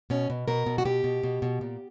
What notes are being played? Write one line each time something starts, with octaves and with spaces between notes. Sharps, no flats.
B2 C#4
B2
B2 A#4
B2
F#4
B2 G4
B2
B2
B2
A#2